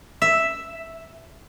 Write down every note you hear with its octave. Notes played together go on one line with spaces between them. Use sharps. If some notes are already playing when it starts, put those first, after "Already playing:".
E5